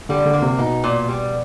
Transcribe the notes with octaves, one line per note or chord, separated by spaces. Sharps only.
D3 G3
D3
A#3
C3
B2 D#4
A#2
G3